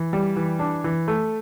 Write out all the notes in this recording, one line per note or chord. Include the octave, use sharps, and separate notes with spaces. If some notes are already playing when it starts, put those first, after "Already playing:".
Already playing: E3
G3
E3
D4
E3
A3